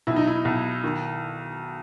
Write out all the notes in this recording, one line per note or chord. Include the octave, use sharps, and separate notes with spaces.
B1 E4
D#4
E4
B1
D#3